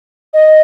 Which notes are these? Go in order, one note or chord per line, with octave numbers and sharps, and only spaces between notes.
D#5